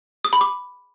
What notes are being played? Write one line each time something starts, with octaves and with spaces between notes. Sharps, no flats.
D#6
B5
D6